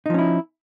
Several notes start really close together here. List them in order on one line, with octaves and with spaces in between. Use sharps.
D#4 F3 C#4 E4